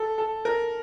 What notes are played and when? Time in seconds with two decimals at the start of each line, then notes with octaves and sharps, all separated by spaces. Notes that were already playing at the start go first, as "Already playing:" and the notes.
Already playing: A4
0.18 A4
0.45 A#4